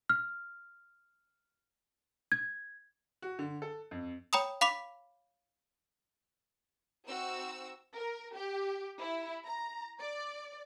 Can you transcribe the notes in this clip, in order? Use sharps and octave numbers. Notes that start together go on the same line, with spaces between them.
F6
G#6
F#4
D3
A4
F2
C#5 G5 A#5 B5 D#6
F5 B5 D6 B6 F7
C4 D#4 F#4 E6
A#4
G4
E4
A#5
D5